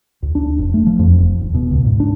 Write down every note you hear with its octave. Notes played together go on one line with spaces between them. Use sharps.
D2
D4
F1
A3
F3
F2
F1
D#1
B2
C#2
G#2
D4